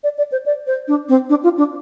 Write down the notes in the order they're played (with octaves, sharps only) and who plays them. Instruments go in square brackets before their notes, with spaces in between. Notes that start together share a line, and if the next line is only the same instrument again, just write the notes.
[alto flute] D5
D5
C5
D5
C5
D4
C4
D4
F4
D4